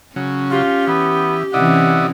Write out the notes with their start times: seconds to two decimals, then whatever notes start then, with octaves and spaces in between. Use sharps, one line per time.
0.16 C#3 F#3 C#4
0.51 F4 G4
0.87 E3 B3
1.54 C3 E3 C#4 E4 D5 D#5 F#5